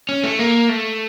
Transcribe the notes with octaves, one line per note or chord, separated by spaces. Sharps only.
C#4
A3
A#3
A3